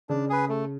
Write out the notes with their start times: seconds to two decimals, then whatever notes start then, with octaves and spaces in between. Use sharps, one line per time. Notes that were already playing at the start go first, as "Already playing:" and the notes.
0.09 C#3 D4
0.30 G#4 B4
0.49 A3